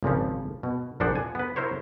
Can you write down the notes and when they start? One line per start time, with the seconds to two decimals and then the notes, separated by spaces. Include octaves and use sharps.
0.03 G#1 A#2 C#3 F3
0.63 B2
1.00 A#1 A#2 F3 C5 D5 F#5
1.15 G#5
1.35 B3 B4
1.56 E4 A#4 C5 C#5